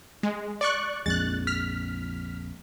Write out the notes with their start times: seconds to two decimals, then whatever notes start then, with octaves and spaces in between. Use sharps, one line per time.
0.23 G#3
0.61 D5 C#6 F#6
1.06 A#1 F2 G#3 F#6 A6
1.47 F6 B6